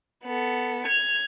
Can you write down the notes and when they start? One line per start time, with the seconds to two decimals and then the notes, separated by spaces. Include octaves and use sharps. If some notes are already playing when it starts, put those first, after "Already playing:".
0.24 B3 A4
0.86 G#6 F7